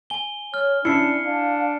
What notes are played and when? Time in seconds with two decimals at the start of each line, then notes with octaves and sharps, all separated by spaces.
0.10 G#5 G7
0.54 C#5 F6
0.85 C#4 D4 E4 C7 C#7
1.25 D4 F5